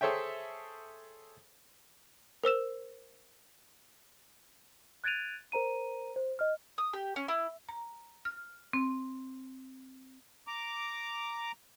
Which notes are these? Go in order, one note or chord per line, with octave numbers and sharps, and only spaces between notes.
G#4 A4 C5 C#5 E5 G5
A#4 C5 E6 E7
F#6 G#6 A6 D7 D#7 F7
A#4 C5 A#5 D#7
C5
D#5 F6
D#6
G4
C#4
E4
A#5
F6
C4
A#5 D6